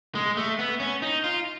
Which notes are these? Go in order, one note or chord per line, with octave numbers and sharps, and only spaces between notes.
G#3
A3
B3
C#4
D#4
F4